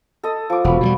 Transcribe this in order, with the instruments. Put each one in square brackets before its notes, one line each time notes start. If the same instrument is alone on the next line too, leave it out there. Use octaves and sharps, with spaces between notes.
[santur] A4 D#5
F3 D6
[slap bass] E1 [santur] F#4 B4
[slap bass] B2 F#3 G3